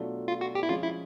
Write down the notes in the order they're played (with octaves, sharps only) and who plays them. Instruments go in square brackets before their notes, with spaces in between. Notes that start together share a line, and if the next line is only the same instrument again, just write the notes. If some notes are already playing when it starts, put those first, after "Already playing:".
Already playing: [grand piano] B2 F#3 A3 D4 F4
[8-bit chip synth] F4
F#4
G4
E4
[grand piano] F3 G#3 C#4 [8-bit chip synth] F4
[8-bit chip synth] E4